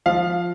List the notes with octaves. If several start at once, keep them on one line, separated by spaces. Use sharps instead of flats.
F3 F5